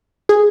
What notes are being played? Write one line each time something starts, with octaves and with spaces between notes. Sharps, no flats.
G#4